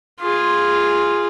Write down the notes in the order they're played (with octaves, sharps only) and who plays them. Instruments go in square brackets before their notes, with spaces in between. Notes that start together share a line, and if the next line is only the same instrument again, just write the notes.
[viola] F4 G#4